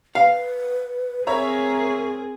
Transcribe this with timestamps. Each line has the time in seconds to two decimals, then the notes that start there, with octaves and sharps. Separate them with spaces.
0.15 B4 F5
1.27 C4 G#4 A#4 C#5 E5 A#5